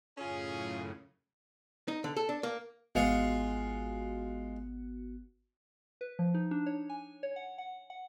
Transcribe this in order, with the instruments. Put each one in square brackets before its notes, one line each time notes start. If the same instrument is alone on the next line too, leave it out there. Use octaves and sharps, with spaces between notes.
[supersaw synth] F#2 A2 C#3 [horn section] C#4 F4 G#4
[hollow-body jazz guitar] D#4
D3
A4
D4
A#3
[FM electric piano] G#1 B3 F#4 [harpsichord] G#3 F4 C#6
[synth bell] B4
F3
D#4
D4
C#5
G#5
C#5
F#5
F#5
F#5